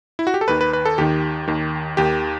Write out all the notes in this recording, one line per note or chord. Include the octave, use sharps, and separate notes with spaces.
E4
F#4
G4
A4
D#2 D#3 B4
B4
B4
A4
D#2 D#3 G4
D#2 D#3
D#2 D#3 G4